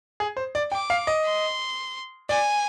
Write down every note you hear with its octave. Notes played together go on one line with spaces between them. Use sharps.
G#4
C5
D5
G5 D6
F5
D#5
C6
D5 G#5